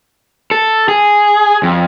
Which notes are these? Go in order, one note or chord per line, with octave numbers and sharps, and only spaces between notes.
A4
G#4
F2